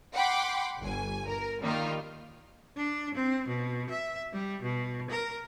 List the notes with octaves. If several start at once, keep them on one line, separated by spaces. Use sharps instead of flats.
F#5 G5 B5 C6 D6
G1 G#5
A#4
D#3 G3 A#3 D#4 F4
D4
C4
B2
E5
G3
B2
A#4